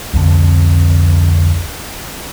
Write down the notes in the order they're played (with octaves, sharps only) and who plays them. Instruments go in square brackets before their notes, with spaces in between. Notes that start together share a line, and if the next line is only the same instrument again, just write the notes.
[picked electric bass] C2 F2 D3